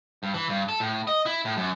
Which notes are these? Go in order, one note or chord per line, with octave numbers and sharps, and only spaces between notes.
G2
E3
G2
A4
A2
D#5
E4
A2
F#2